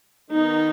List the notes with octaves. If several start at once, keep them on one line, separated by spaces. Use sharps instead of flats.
D#3 B3 D#4